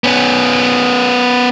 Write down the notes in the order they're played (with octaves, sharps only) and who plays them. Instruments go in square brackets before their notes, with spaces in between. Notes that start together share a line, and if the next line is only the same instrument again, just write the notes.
[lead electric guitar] B3 C#4